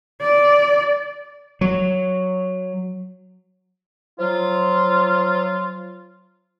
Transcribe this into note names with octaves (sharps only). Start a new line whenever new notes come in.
D5
F#3
F3 F#3 F4